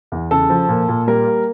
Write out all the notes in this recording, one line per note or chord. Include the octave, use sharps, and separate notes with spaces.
E2
C#3 A4
F3
A#2
A#2
G3 A#4
A#3